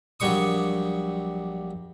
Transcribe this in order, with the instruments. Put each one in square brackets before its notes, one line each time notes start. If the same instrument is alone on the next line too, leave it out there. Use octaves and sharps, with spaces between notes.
[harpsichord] A#1 F#3 G3 C#6 D#6